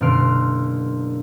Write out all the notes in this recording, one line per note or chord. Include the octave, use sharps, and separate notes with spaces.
F#1 B2 D3 C6 F6 D7